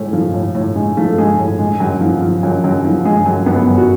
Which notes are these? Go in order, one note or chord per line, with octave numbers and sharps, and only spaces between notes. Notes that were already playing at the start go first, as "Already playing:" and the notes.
Already playing: A2 G#3 A3
F3
A2
A2
G#3
F3 A3
G#3
A2
G#3
F#2
F3
F3
F#2
F#2
F3
G#3
F#2
F#2 B3
F#2
F#4